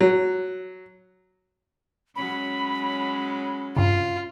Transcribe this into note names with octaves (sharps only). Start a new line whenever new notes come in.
F#3
F#3 G#3 C#4 B5
G2 C#3 F4